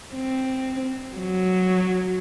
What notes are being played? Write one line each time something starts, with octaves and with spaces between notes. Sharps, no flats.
C4
F#3